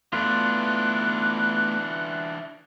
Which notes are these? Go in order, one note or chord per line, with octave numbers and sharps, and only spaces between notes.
E3 A3 B3 D4 F4 F#6